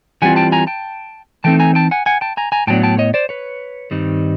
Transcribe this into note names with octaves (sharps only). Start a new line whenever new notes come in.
E3 G3 C4 F4 F#5 G#5
G5 A5
G#5 A#5
G5 A5
E3 A3 C4 D#4 G5 A5
G#5 A#5
G5 A5
F#5 G#5
F#5 G#5
G5 A5
G#5 A#5
G#5 A#5
A2 F#3 B3 D4 G5 A5
G5 A5
C#5 D#5
C5 D5
B4 C#5
G2 D#3 G3 C4 D#4